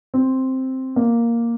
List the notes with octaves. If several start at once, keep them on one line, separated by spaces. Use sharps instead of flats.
C4
A#3